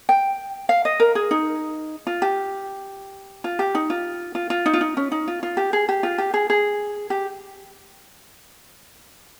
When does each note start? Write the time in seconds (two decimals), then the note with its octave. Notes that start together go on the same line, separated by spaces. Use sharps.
0.09 G5
0.69 F5
0.85 D#5
1.00 A#4
1.15 G#4
1.31 D#4
2.07 F4
2.22 G4
3.44 F4
3.59 G4
3.75 D#4
3.90 F4
4.35 F4
4.50 F4
4.66 D#4
4.74 F4
4.81 D#4
4.97 C#4
5.12 D#4
5.28 F4
5.43 F4
5.57 G4
5.73 G#4
5.89 G4
6.03 F4
6.18 G4
6.34 G#4
6.50 G#4
7.10 G4